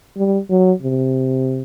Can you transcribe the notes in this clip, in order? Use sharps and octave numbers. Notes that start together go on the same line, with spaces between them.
G3
F#3
C3